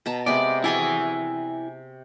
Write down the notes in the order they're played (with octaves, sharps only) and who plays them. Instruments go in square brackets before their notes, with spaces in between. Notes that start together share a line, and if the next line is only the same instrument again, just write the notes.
[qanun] B2 A5 A#5
[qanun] C3 G#3 B3 [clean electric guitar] D5
[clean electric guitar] E4 G#5 [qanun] F#4 G#4 D5